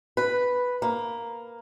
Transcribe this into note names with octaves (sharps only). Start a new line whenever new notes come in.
B4
A#3